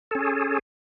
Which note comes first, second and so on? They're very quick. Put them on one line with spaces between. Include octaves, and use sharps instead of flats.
A4 C#4 G#4